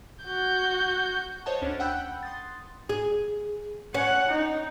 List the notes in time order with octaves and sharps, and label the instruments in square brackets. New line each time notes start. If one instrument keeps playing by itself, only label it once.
[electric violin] F#4 G6
[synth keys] C5 C#5 D#5 F#5 A5
D2 C#4 D4
F#5 G5 B5 E6 F#6 G6
C6 D#6 A6
[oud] G#4
[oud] C#4 [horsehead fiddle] F#5
[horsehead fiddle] D#4